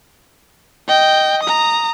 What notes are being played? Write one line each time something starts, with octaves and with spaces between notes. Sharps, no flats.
D#5 G5
A#5 D#6